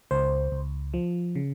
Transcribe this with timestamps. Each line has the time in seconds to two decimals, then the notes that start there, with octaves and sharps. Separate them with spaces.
0.11 C#2 C5
0.52 C#2
0.94 F3
1.35 C#3